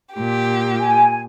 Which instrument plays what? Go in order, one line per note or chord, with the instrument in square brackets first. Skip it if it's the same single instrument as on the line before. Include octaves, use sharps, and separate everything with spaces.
[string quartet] A#2 G4
[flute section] G#5